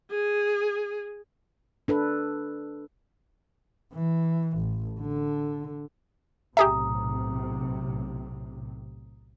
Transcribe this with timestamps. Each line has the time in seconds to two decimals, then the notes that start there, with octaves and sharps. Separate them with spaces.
0.11 G#4
1.88 D4 A4 B4
3.93 E3
4.58 A1
5.00 D3
6.57 B1 A2 C3 G4 G#4 E5 A#5 D#6